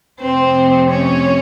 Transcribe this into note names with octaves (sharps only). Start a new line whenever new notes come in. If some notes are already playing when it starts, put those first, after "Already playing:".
F2 C3 F3 A3 C4 C5
C#4 C#5